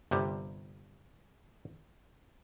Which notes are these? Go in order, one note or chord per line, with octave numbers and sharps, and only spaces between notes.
G1 C3 G3